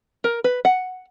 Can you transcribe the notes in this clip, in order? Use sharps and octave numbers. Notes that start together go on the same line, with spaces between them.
A#4
B4
F#5